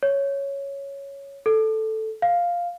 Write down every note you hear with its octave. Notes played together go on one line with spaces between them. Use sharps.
C#5
A4
F5